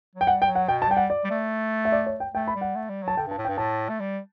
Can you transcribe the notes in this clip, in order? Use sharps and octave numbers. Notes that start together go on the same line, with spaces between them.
F#3
G5
G3 F#5
G5
F#3
F#5
B2 G5
A5
G3 G5
F#5
D5
G3
A3
E5
D5
C#5
G5
A3 G5
B5
G3
F#5
A3
G3
F#3 A5
D3 G5
G2
A5
A2
G5
G2
A2 A5
A3
G3